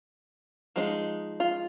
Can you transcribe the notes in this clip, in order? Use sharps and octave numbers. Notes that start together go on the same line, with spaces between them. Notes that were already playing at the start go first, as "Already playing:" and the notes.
F3 G#3 C4 D#4
F4